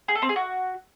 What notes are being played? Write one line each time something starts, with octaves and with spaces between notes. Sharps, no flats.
G#4
A4
C4
G#4
F#4